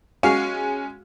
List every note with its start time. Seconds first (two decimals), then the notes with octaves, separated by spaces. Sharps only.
0.23 G#3 C#4 F#4 F5